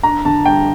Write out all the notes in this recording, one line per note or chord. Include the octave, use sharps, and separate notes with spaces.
D4 A#5
D3 A5
G2 G5